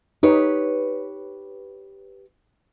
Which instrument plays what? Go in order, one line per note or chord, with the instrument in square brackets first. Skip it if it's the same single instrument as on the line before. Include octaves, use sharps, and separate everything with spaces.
[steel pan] D#4 [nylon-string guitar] G4 B4 C#5